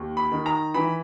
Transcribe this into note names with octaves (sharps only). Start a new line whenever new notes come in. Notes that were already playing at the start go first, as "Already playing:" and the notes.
Already playing: D#2
B5
D#3
A#5
E3 B5